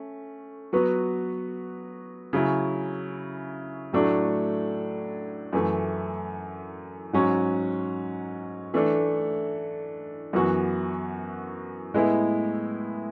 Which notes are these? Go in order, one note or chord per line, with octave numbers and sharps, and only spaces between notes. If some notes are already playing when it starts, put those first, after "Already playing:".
Already playing: A3 C#4
F#3 B3 F#4 B4
C#3 F#3 C#4 E4
A2 F#3 A3 D4 A4
F#2 E3 A3
G#2 F#3 C#4
E3 A3 D4 A4
F#2 E3 B3 F#4
A2 G#3 B3 E4